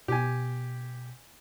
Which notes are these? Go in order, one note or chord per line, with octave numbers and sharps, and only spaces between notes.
B2 G4 G#5